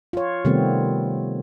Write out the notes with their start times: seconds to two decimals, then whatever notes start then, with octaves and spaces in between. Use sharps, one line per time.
0.13 F4 C#5
0.45 C3 D#3 G3 A3 B3 C4